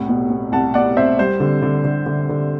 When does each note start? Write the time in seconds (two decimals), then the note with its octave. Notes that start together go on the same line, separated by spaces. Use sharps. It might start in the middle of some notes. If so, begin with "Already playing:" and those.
Already playing: C2 A2 F#5
0.08 B2
0.30 B2
0.52 C2 F#5 A5
0.74 B2 D5 F#5
0.97 C2 C5 E5
1.19 G3 C5
1.40 D3
1.62 D3
1.84 D3
2.06 D3
2.29 D3